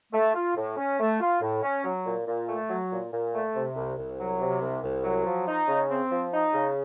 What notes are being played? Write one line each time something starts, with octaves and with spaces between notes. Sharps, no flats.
A3
F4
A2
C#4
A3
F4
A2
C#4
F#3
A#2
A#2
A3
F#3
A#2
A#2
A3
C3
C2
C2
F#3
C3
C2
C2
F#3
F3
D#4
C#3
C4
F3
D#4
C#3